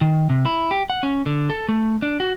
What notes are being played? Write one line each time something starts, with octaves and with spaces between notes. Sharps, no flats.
D#3
C3
E4
G4
F#5
C#4
D3
A4
A3
D4
F#4